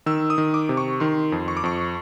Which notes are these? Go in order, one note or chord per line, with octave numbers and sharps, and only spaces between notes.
D#3 E6
D#6
D#3
D6
C3
C#6
D#3 C6
F2
C#6
D6
F2 C#6